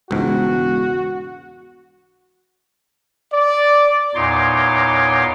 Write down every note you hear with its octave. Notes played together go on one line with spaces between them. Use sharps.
E1 C#2 G#2 F#4
D5
E2 A#2 D#4 C#5 C6 D6